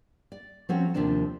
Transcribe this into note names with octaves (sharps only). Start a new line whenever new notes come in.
D5
F3 C4 C#4 F#4 A4 C#5
D#2 C3 F3 C4 D4 A5